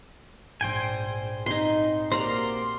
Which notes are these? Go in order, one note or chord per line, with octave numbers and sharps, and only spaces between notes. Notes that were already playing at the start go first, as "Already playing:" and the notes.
A#1 G#2 C5 G5 G#5
C4 D#4 C6
A#3 F#4 G4 A#4 C5 D5 A#5 C6